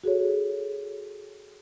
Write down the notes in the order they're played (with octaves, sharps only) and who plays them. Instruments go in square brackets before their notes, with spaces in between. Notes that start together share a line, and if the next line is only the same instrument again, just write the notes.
[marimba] F#4 G#4 A4 C#5